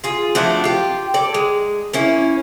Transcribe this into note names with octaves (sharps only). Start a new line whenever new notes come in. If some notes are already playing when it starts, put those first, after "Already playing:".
F4 G#4
F3 F#3 A3 D4
F4 G4
A4 D5
G#3
A#3 C#4 E4